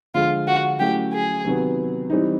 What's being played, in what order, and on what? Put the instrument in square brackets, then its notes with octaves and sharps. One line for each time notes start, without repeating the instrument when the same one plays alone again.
[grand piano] D3 F3 G#3 [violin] F4
[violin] F#4
[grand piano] F#3 A3 C#4 E4 [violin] G4
[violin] G#4
[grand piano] C3 D#3 F#3 B3
E3 G3 C4 D#4